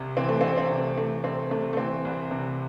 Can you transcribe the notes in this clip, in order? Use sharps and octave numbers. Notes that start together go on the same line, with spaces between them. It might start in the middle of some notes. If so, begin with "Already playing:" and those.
Already playing: C2 C3
E3 C4
A3
C4
C2
C4
C3
E3 A3
C2 C4
C3 A3
A3
E3 C4
C2
C3